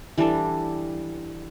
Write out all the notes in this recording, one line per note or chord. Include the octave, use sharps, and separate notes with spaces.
E3 G3 D4 A4